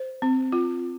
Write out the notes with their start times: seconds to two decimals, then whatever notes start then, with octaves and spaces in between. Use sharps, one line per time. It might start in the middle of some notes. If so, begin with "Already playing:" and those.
Already playing: C5
0.22 C4
0.52 F4